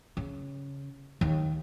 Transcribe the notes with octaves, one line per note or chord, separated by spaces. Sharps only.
C#3
D#2